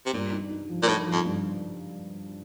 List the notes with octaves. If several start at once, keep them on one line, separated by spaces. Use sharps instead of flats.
C3
G2 A#2
D#4
D#4
F3
A#2
A2 D#4
F3
F2
G2